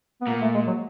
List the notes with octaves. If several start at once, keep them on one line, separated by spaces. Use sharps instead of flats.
B3
A#2 A#3
A3
G#3
F#3